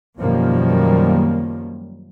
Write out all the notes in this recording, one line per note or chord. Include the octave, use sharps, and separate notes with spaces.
F#2 B2 D#3 F3 G3 A#3